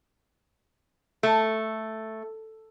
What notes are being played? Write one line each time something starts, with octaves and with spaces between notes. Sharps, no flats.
A3